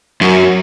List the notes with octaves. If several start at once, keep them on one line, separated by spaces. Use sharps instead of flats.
F#2